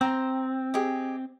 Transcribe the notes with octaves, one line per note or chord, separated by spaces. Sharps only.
C4 C5 G5 A#5
G4 G#4 D#5